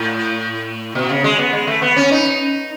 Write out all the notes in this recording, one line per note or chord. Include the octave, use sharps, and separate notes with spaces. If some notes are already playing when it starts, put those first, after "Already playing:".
Already playing: A2
B2
C#3
G#3
B3
G#3
A3
B3
C#4
D#4